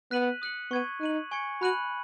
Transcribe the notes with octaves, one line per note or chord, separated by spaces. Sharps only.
B3 F#6 B6 D#7 F#7
D#6 F#6 C#7 F#7
B3 C#6 G#6 D#7
D#4 F#6 D#7 F#7
G#5 C#6 G#6 C#7
F#4 B5 F#6 D#7 F#7